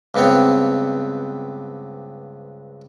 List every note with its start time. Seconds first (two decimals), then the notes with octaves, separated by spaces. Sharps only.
0.14 C#2 G2 B3 C4 C#5